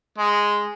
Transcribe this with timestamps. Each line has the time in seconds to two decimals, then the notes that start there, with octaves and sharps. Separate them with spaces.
0.18 G#3